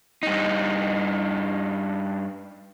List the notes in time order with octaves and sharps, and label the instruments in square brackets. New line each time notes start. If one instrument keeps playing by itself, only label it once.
[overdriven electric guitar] G2 D#4